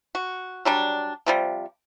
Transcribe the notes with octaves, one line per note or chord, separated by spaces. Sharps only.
F#4
F#3 G3 D4
C3 F3 G3